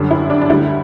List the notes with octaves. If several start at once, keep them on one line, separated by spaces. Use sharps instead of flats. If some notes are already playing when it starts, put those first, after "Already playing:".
Already playing: F#2 D3 G3
E4
D4
D4
D2 D3 G3 E4